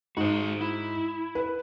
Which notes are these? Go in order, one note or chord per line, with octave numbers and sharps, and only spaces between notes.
G#2 F#4 C5
E4
B4